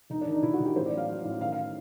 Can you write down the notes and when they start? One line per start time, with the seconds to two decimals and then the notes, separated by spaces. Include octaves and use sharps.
0.10 E1 D#4
0.21 D4
0.26 D#3
0.32 D#4
0.42 E1 E4
0.53 F#4
0.59 E1
0.65 G4
0.76 A1 C5
0.86 D5
0.92 F#3
0.97 F5
1.09 F#3
1.25 A1
1.41 D#3 F5
1.52 F5